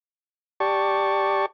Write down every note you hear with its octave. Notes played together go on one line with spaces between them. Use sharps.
G4 D5 A5 C#6